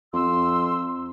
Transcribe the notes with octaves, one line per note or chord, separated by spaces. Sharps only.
F2 C6 E6